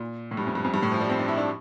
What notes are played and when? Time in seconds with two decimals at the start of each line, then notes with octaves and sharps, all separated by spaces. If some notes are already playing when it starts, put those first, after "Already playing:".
Already playing: A#2
0.31 A2
0.37 G2
0.47 F2
0.55 G2
0.64 F2
0.74 G2
0.83 A2
0.92 F3
1.01 G3
1.10 C4
1.19 D4
1.28 E4
1.38 D4